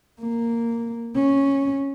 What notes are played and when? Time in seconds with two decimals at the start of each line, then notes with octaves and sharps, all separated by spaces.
0.20 A#3
1.15 C#4